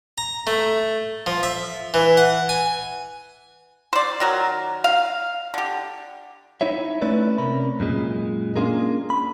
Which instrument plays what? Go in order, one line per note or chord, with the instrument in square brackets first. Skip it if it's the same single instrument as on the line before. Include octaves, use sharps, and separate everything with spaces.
[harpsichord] A#5
A3
F3
E5
E3
F#5
G#5
[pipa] C5 D5
D#3 F#3 A#4
F5
D3 G4
[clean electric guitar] D#4 E4 C#5 E5
A3 C#4 E4 B4 D5
C3 C#4 A#4 B5
F#2 A#2 G#3
A#3 C#4 D4 F4 G#4 A#4
B5